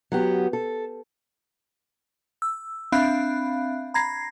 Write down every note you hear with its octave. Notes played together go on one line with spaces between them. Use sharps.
F#3 B3 G4
A4
E6
C4 D4 E5 F5 B5 F#6
A#5 B5 G#6 A#6 C7